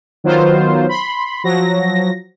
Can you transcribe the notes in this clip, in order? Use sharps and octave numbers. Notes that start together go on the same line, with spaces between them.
D#3 F#3 B3 F4 C5
B5 C6
F3 F#3 A#6